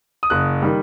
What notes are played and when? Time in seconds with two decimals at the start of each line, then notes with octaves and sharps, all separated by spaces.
0.23 D#6
0.30 F#1 F#6
0.62 D#3 G3